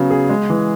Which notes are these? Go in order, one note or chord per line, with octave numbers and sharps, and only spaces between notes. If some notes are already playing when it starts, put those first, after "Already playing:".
Already playing: C#3 F#3 B3
G#4
G#3
E3